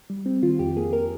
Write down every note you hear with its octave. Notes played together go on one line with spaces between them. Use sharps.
G3
C4
D#3 F4
F2 G4
A#3 G#4
A#4